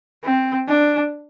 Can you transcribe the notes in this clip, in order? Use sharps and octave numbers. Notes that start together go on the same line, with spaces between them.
C4
D4